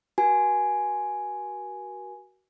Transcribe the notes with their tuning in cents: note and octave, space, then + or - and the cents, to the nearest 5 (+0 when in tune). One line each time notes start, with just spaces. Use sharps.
F#4 +20 A#4 +40 G#5 +5